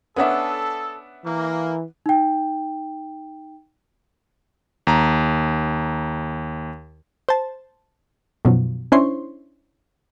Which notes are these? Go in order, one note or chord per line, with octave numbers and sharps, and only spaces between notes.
B3 C#4 D4 A4 E5 F#5 D#6
E3 A#3
D#4 G5
D#2 A#5
C5 A5
F#2 B2 D#3 F3 F#3
C#4 D4 E4 C5 C6 C#6